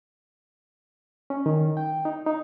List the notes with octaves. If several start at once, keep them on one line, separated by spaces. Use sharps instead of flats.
C#4
D#3
G5
D#4
D#4